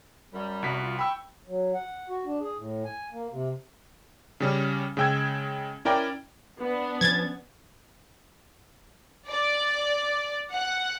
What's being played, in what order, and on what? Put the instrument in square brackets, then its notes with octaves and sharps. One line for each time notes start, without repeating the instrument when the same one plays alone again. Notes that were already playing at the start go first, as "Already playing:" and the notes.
[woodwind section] F#2 G3
[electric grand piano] C2 F#4 B6
[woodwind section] F4
[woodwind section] G5 C#6 [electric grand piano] B5 E6
[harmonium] F#3
F#5
F#4
D4
G#4
A2
G#5
A#3
C3
[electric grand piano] C#3 G3 C#4
C#3 G#3 G5 E6 G#6
C#4 E4 A#4 D5 G5
[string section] B3 D4
[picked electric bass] F3 C#4 [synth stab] G#6 A6
[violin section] D5
F#5